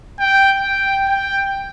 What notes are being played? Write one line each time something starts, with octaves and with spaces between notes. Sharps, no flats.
G5
G5
G5